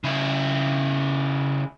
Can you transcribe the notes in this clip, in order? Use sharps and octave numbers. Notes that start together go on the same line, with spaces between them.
C#3 E4